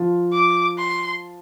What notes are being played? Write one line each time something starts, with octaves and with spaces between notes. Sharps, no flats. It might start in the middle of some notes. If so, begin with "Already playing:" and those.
Already playing: F3 F4
D6
C6